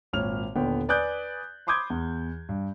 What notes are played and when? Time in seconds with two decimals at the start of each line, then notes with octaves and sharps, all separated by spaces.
0.13 G#1 A#2 C#5 F6 F7
0.56 D#2 A#2 D3 B3 G5
0.89 B4 D5 G#5 D#6 F#6 G6
1.67 B5 C6 D6 D#6 G6 G#6
1.90 E2
2.49 G2